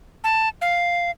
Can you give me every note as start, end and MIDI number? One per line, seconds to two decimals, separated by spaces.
0.24 0.49 81
0.61 1.11 77